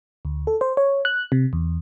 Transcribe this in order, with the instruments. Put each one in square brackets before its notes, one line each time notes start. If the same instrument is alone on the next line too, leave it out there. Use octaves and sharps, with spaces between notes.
[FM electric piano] D2
A4
C5
C#5
F#6
C3
E2